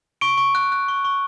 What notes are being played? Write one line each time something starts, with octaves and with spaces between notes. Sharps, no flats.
C#6 D7
C#6
F#6
F#6
C#6
C#6